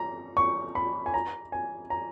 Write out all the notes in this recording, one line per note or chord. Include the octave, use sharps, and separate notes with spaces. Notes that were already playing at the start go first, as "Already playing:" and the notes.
Already playing: A#5
C#6
B5
G#5
A#5
G#5
A#5